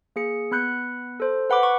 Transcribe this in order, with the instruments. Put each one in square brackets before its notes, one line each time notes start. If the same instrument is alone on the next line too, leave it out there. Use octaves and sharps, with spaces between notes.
[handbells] A#3 G#4 C#7
B3 B5 F#6 G6 C#7
A4 C5
B4 F#5 B5 D6
C#6